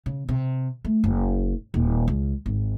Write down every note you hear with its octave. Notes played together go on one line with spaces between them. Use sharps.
C#3
C3
A3
F#1
D#1
C#2
G#1